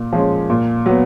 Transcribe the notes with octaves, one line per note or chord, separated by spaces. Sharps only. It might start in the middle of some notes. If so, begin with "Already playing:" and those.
Already playing: A#2
F3 G#3 C#4
A#2
F#3 B3